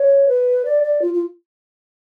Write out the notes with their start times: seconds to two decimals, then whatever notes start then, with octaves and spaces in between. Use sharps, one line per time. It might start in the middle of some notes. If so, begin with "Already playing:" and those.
Already playing: C#5
0.28 B4
0.65 D5
0.83 D5
1.02 F4
1.14 F4